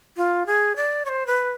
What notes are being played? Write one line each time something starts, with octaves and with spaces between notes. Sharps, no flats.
F4
G#4
D5
C#5
C5
B4